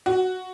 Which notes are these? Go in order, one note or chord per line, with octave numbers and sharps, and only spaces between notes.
F#4